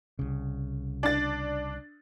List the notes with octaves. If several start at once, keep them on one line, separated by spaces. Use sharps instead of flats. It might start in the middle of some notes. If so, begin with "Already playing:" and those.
C2 C#3
D4 A6